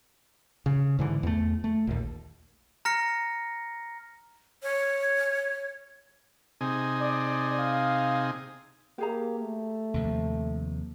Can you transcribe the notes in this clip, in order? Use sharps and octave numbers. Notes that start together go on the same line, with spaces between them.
C#3
G#2 D3 E3
E2 A3
A3
A#1 D#2
A#5 F6 A#6 C#7
C#5
C3 D#4 G#4
D5
F5
A#3 G4 G#4 A#5
A3
D#2 C3 F3